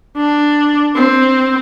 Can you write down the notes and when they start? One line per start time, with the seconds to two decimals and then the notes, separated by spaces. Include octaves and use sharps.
0.17 D4
0.95 C4